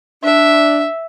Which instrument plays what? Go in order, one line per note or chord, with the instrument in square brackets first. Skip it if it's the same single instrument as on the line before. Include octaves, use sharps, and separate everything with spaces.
[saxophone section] D4 [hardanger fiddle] E5